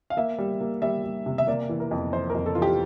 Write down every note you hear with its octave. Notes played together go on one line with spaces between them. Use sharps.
F5
A#3 E5
G3
A#3
G3 E5
G3
C3
E5
A#3 D5
E3
A#4
F2
E3 C5
A#4
F2
A4
E3 F4
G4